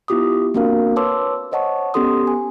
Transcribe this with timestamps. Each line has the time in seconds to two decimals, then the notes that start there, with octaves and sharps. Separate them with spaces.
0.08 B3 E4 F4 G4 D6 D#6
0.54 A#3 C4 D4 F#4 A#4 F5
0.96 B4 C#5 A5 C6 D6 E6
1.52 C5 C#5 D#5 F#5 A5 C#6
1.94 B3 C#4 G4 A4 C6 D#6
2.27 G#5